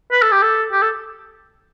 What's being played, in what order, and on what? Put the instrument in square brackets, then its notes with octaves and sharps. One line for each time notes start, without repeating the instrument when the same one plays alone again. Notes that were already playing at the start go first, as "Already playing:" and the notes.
[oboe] B4
A4
G4
A4
G4
A4